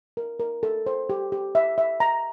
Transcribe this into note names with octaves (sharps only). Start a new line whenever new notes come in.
A#4
A#4
A4
C5
G4
G4
E5
E5
A#5